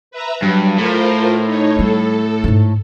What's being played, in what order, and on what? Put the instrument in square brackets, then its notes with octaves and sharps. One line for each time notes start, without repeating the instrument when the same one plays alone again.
[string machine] B4 E5 A#5
[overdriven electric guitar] G2 [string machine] F#3
[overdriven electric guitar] A2 [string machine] F4 A#4 C5
[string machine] D#4 C#5
[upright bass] G3 [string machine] A4
[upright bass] G#2 D#4